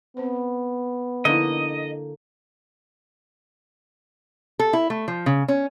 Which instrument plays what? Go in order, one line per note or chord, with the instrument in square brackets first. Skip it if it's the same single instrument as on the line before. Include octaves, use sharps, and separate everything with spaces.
[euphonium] B3 [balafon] C4 C5
[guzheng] D3 A#3 [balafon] F3 D#4 E4 [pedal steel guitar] D#5
[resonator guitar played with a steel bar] A4
E4
A3
F3
C#3
C#4